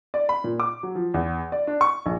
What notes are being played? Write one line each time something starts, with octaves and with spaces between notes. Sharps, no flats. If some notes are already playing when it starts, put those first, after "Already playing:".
D5
B5
A#2
D6
F#3
F3
E2
D5
D4
C#6
A#1